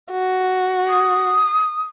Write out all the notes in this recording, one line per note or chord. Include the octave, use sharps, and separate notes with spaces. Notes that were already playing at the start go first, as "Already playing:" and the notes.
F#4
D#6